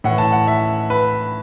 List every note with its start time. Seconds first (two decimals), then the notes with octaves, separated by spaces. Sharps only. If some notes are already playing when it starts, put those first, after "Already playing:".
0.04 A2 E3 F#5
0.18 A5
0.32 F#5
0.47 E5
0.90 B4